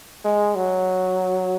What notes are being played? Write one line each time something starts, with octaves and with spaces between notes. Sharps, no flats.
G#3
F#3